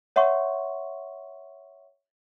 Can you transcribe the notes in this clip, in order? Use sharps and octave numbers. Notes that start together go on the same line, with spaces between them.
C#5 E5 F#5 C6 C#6